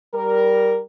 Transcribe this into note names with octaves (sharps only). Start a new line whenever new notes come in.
G3 A#4